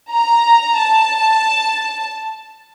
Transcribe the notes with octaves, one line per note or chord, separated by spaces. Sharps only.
A#5
A5